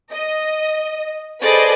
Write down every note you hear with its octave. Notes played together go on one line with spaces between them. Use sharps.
D#5
G#4 A4 B4 C5 D5 D#5